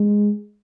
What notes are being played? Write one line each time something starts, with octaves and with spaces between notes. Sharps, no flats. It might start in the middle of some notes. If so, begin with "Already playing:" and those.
Already playing: G#3